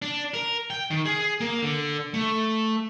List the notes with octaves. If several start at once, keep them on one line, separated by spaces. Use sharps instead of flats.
D4
A#4
G5
D#3
G#4
A#3
D3
A3